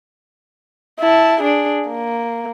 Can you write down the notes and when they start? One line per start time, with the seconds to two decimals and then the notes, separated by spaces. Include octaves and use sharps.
0.99 E4 A5
1.40 D4 G#4
1.88 A#3